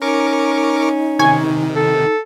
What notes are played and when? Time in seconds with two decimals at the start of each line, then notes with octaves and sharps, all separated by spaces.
0.02 C#4 D#4 A#4 C#6 D6
1.19 C3 D#3 G#5 C#6 G#6
1.76 A4